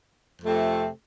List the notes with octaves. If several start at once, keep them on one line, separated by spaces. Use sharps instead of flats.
F2 C3 A3 C4